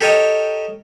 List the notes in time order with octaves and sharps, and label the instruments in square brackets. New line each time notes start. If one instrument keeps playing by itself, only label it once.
[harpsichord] G4 A4 A#4 C#5 D#5 G5